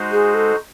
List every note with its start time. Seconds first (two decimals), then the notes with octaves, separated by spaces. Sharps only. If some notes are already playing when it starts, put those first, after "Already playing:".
Already playing: G#3 D#4 F#4 C5
0.12 G#4
0.34 A4